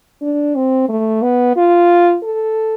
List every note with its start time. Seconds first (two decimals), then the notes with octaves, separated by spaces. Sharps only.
0.22 D4
0.55 C4
0.89 A3
1.22 B3
1.56 F4
2.23 A4